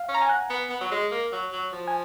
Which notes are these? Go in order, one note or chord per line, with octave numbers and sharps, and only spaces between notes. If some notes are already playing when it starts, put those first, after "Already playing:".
Already playing: F5
C#4
A#5
G#5
F#5
B3
B3
F#3
G#3
A#3
F#3
F#3
F3
G#5